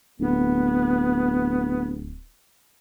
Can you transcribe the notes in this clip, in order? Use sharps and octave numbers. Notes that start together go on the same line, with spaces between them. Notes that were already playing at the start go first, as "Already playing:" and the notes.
D1 B3